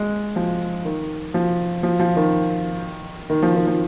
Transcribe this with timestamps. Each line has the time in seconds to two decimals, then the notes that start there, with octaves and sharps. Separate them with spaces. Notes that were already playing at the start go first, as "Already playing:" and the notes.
Already playing: G#3
0.36 F3
0.85 D#3
1.34 F3
1.83 F3
2.00 F3
2.16 D#3
3.30 D#3
3.43 F3
3.55 D#3
3.67 F3